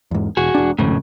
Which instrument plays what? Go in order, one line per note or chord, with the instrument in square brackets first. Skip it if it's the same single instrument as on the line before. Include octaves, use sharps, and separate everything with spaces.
[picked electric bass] E2 G#2
[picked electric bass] E1 [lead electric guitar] F#4 G#4
[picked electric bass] E1 D4
[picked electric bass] G#1 F2 [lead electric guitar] A2 C#3